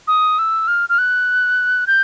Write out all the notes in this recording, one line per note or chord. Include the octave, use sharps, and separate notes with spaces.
D#6
E6
F6
F6
F#6
G6